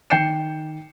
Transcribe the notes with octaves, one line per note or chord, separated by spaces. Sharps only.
D#3 G5 G6 C7 C#7 E7